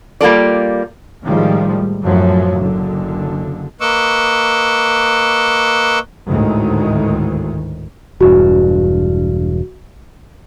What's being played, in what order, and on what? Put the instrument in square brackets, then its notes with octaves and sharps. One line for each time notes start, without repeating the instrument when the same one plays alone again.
[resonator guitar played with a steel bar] G3 A#3 F4 A4 D5
[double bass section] A2 D#3 F3 G3 G#3
F#2 A2 F3 F#3
F#1 D3
[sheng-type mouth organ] A#3 B4 D#5 C#6 D6 E6
[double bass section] G#1 D2 A2 D#3 G#3
[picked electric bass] E1 G2 [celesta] F#4